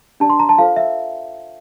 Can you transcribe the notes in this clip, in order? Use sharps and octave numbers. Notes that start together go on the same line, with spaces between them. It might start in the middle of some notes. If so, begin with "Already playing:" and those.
D4 G4 D5 A5
C6
A#5
A5
F4 A4 C5 F5
E5